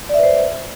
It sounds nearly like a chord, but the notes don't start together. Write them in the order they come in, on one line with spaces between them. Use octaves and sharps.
D5 E5 B4 C5